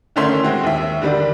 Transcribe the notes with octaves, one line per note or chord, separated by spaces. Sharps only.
D3 D#3 A3 C#4 E4 C6
G#3 C4 F#4
D#2 E5
D3 D#3 G3 D4